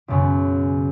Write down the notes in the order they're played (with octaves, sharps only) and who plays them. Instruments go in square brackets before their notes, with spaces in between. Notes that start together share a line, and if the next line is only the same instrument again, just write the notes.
[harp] B1 F#2 C#3